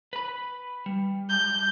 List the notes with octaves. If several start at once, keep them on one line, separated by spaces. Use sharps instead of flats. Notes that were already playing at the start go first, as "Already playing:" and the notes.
B4 B5
G3
G6